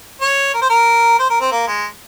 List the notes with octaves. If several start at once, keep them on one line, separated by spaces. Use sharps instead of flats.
C#5
A#4
C5
A#4
C5
A#4
C4
A#3
G#3